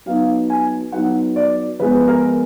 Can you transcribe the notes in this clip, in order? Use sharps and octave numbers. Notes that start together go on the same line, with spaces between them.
F#3 B3 D#4 F5
G#5
F#3 B3 D#4 F#5
D5
F3 G#3 B3 B4
A#4